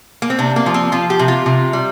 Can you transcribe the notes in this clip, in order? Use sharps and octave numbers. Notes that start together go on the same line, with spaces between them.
A#3
C4
C3 D4
A#3
F3
C4
F3 F4
G4
C3
F4
C3
G3